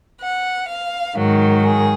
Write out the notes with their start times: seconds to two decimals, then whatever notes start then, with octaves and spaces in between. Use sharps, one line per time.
0.21 F#5
0.69 F5
1.16 G#2 D#3 F#3
1.64 G#4